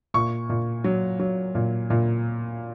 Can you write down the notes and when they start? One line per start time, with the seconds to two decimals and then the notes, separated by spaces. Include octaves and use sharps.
0.14 A#2 C#6
0.49 A#2
0.84 F#3
1.20 F#3
1.55 A#2
1.90 A#2